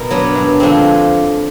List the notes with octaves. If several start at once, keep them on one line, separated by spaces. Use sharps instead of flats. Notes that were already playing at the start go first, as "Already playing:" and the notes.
Already playing: B2 A#4
F#3 B3 D4
G2
D3 F3 G#3 C4